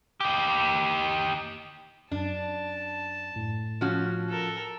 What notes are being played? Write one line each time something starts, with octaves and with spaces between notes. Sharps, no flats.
D#4 G4
F#2 D4 A5
A2
F3 C#4 F#4
A4 A#4